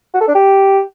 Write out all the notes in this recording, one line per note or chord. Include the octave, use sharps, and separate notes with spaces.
F#4
A4
D4
G4